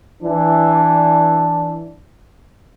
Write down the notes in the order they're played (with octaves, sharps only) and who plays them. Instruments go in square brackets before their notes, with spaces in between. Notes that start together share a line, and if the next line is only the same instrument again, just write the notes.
[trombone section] E3 D4